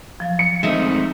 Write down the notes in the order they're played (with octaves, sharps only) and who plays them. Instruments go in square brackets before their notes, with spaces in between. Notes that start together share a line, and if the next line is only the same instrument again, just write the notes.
[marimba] F3 F#3 F5
[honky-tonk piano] C#7
[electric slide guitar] G#3 A3 C4 [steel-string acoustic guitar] D#4 D#5 E5